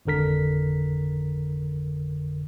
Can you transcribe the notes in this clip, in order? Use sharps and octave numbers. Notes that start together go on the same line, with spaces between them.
G#1 F2 D3 A#4 B6